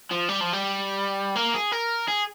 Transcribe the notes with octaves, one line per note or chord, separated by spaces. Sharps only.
F3
G3
F3
G3
A#3
G#4
A#4
G#4